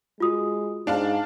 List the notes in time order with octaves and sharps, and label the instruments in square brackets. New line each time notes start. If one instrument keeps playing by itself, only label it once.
[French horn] G#3 [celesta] F4 F#4 D#6
[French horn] G#2 [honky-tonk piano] D4 F5 A5